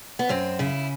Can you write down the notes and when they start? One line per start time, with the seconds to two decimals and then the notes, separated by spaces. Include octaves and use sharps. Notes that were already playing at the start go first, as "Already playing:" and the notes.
0.19 B3
0.29 F#2 C4
0.59 C#3 E4